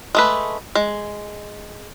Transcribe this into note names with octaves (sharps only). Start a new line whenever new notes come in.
G#3 A3 B4
G#3